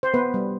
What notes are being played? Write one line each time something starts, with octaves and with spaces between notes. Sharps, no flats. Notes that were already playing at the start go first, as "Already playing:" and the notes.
C5
B3 B4
G3